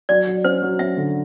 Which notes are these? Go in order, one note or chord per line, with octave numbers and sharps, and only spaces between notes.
F#3 D5
F#3
C#4 C5
F#3
C#4 E5
D3